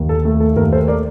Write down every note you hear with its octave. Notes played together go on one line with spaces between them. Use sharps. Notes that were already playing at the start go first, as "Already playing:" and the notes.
Already playing: D#2
A4
A3
A4
D#2 A#4
A4 C5
A#4 D5